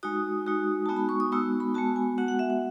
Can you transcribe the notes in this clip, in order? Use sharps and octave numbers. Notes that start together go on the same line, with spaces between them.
G#3 D#4 F#4 D#6
G#3 D#4 F#4
G#3 B3 D#4 F#4 A5
B5
C#6
D#6
G#3 B3 D#4 F#4 E6
B5
G#3 B3 F#4 A5
G#5
G#3 B3 F#4 F#5
F#5
E5
F#5